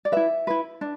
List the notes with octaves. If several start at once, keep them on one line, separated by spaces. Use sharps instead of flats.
D5
E4 B4 E5
E4 B4
D4